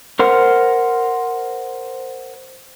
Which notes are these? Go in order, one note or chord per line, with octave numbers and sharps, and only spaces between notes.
A#4 C5 F#5 F6